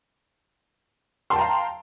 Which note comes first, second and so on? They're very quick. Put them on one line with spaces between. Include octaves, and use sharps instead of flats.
C6 A5 G5 A#5 F5